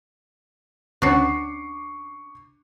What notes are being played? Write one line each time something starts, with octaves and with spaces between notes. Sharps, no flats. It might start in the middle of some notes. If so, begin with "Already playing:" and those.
D2 C#4 D4 F#4 C#6 D6 C7